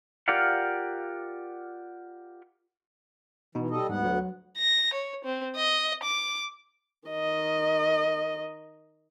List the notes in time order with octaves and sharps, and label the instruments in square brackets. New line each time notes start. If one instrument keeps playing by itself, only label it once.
[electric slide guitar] F4 G4 A#4 D5 F5 F#5
[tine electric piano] B2 D#4 [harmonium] E3
[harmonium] G3 A4 D#5
[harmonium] D2 B3 F#5 [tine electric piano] G#2 G3
[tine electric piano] F#3
[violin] A#6
C#5
C4
D#5
D6
[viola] D#3 D#5